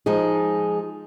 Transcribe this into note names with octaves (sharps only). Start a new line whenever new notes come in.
F3 G#3 D#4 G#4